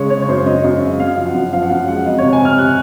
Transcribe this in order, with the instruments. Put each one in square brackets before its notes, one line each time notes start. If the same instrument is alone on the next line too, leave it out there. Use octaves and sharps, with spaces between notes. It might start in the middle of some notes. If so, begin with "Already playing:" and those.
Already playing: [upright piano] C#3 G#3 C#5
C#3 C#5
C#5
F#2 C5
F#2 D#5
F#2
C#3
F#2 F5
F3
F#5
F#2
F3 F5
F#5
F#2 F5
G#3 F#5
F2 D#5
C#5
C3
G#5
C3 F6
C3 F#6